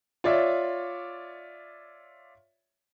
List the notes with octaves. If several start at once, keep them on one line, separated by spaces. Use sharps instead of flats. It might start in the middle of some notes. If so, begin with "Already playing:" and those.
F4 C#5 D5 E5